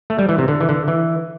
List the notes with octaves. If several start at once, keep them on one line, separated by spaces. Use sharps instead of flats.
A3
G3
E3
C3
D3
E3
D3
E3